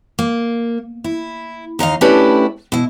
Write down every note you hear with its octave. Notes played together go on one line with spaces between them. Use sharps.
A#3
E4
D#2 D#4 D#5 F5
A3 C#4 D4 E4 G4 B4
B2 E4